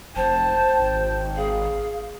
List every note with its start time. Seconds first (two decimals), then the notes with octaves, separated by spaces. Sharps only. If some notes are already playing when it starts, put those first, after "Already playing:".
0.16 F1 C5 G5 A5
0.79 G#1
1.37 G#4 F5